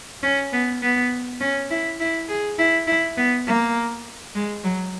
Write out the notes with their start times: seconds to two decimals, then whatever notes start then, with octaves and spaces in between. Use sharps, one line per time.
0.23 C#4
0.53 B3
0.82 B3
1.41 C#4
1.70 E4
2.00 E4
2.29 G#4
2.59 E4
2.87 E4
3.17 B3
3.47 A#3
4.35 G#3
4.64 F#3